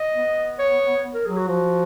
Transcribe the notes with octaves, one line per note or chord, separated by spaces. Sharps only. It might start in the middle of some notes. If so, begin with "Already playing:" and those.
Already playing: D#5
B3
C#5
A#4
F#3 G#4
F#4
F3 F#4